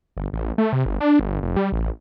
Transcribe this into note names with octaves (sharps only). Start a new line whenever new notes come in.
G1
A1
A3
C3
G1
D4
G1
F1
G3
A1